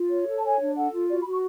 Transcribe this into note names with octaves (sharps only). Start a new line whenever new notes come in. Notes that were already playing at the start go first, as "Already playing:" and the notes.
Already playing: F4
C#5
A4
A5
C#5 G#5
D4
A4 F#5
F4
F#4 D5
B5
F#4
C#6